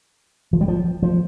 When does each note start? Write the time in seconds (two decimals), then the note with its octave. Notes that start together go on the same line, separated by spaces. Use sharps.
0.53 F3
0.61 G3
0.68 F3
1.03 F3